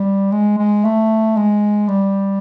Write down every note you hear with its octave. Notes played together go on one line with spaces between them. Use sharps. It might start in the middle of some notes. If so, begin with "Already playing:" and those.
Already playing: G3
G#3
G#3
A3
G#3
G3